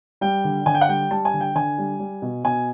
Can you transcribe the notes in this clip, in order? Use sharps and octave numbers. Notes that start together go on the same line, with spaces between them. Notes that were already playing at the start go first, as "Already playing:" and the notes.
G3 G5
D3
D3 G#5
G5
F#5
G3 G5
G3 A5
G#5
D3
G5
D3 G#5
G3
G3
B2
B2 G#5